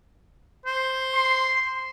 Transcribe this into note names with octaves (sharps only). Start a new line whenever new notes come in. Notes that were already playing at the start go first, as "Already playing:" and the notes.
C5
C6